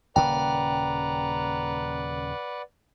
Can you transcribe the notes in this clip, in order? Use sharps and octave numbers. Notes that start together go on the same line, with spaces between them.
D#1 C#3 A#3 B4 D5 F#5 G5 A#5